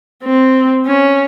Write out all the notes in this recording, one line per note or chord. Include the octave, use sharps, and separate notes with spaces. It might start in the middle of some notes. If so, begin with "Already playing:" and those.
C4
C#4